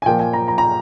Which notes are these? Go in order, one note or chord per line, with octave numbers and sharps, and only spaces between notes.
G#5
A#2 F3 A#3 G5
G#5
A#5
A#5
A#5